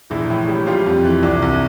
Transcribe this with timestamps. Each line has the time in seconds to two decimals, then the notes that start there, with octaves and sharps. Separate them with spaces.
0.10 A#1 E3 E4
0.30 A2
0.49 G3
0.66 F3 G3 F4
0.86 F2
1.05 E3
1.23 C2 D4
1.42 C2